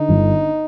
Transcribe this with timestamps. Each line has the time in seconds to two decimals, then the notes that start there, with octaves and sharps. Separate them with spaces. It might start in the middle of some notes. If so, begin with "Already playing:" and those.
Already playing: D3 D#4
0.09 G1